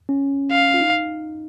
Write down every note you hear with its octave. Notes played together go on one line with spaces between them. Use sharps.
C#4
F5
F4
D#4